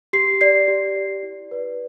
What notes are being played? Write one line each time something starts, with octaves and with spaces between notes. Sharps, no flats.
G4 C7
D5 C7
G4
D5
E4
B4 D5